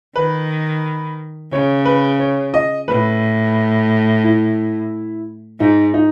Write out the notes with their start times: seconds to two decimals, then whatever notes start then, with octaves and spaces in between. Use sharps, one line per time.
0.16 D#3 B4
1.52 C#3 C#5
1.85 B4
2.19 C#5
2.54 D#5
2.88 A2 B4
4.24 E4
5.60 G#2 D#4
5.94 D#4